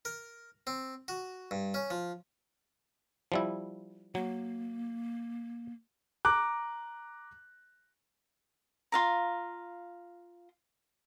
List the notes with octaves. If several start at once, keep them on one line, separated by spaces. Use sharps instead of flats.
A#4
C4
F#4
G2
C#4
F3
F3 G3 E4
F#3 A#3
A#5 D6 F#6
F4 F5 A#5